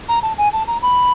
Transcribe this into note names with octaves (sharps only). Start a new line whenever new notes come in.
A#5
A5
G#5
A5
A#5
B5